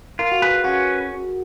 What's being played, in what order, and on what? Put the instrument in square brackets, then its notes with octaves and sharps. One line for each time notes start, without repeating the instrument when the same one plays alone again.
[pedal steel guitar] F4 [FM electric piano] A#4
[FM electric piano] F#4
[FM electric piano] G#4 [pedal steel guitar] B4
[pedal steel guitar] C#4 [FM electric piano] F#4